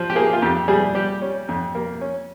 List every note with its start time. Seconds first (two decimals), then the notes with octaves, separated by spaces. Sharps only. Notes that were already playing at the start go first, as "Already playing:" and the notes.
Already playing: F3 C5
0.10 G4
0.16 A#3 G#4
0.33 F4
0.42 F2 G4
0.68 G3 G#4
0.95 G3 G4
1.22 C#4
1.49 F2
1.75 A#3
2.01 C#4